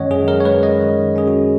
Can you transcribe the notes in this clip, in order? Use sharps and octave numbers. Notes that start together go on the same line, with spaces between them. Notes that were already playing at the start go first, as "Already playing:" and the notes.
Already playing: F#2 D#3 G#3 C#4 C#5 D#5 F#5
F#2 G#4
A#4
C#5
G#3 B4
D#5
D#3
C#4 G#4
F#4